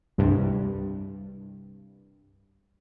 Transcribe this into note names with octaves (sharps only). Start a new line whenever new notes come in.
C2 G2